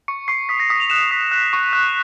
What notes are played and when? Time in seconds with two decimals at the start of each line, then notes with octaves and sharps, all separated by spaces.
0.08 C#6 C#7
0.28 C#6 C7
0.49 D#6 B6
0.60 A#6
0.70 D#6 B6
0.80 F7
0.90 F#6 E7
1.11 D#6 B6
1.31 F#6
1.53 C#6
1.73 F#6